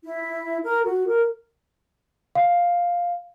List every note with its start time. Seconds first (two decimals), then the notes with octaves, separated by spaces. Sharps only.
0.03 E4
0.63 A#4
0.85 F#4
1.06 A#4
2.35 F5